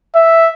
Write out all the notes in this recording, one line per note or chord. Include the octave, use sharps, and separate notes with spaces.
E5